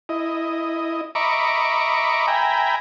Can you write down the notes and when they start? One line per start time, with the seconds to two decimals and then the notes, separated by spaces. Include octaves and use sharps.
0.09 E4 D#5
1.15 D#5 E5 A#5 B5 C#6 D6
2.27 E5 G5 G#5 A#5 B5